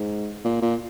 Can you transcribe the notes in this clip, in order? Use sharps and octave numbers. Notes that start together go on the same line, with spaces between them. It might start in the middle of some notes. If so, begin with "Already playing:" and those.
Already playing: G#2
A#2
A#2